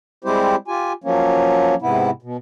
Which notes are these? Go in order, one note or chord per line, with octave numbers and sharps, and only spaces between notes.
G3 G#3 C4 E4 G4 C5
F4 G4 G#5
F3 F#3 A#3 C#4
G#2 C3 B3 E4
B2